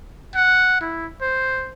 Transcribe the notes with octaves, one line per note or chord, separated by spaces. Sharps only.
F#5
E4
C5